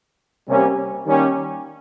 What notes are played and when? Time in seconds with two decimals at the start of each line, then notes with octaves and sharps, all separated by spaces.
0.47 C3 G3 A#3 C#4
1.06 D#3 G3 A#3 C#4 G4